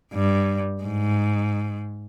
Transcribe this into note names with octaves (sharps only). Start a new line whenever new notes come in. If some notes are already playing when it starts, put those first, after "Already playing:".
G2
G#2